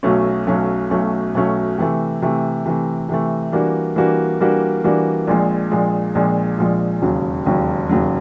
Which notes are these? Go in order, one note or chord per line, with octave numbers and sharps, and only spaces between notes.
B1 B2 F#3 A3 C#4
B1 B2 F#3 A3 C#4
B1 B2 F#3 A3 C#4
B1 B2 F#3 A3 C#4
C3 E3 A3
C3 E3 A3
C3 E3 A3
C3 E3 A3
E3 G3 A#3 D4 F#4
E3 G3 A#3 D4 F#4
E3 G3 A#3 D4 F#4
E3 G3 A#3 D4 F#4
A#1 A#2 F3 G#3
A#1 A#2 F3 G#3
A#1 A#2 F3 G#3
A#1 A#2 F3 G#3
E1 D#2 C#3 F#3
E1 D#2 C#3 F#3
E1 D#2 C#3 F#3